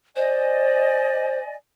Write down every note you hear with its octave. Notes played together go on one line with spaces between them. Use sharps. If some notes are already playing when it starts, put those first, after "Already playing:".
C5 D5 D#5 G#5